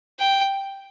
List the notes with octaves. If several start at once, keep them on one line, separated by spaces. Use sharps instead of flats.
G5